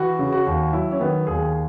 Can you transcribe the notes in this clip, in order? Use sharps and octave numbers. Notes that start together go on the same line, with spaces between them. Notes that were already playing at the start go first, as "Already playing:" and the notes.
Already playing: E3 F#4
C#3
F#4
D#2
F#3 E4
C#4
D#3 B3
D#2 G#4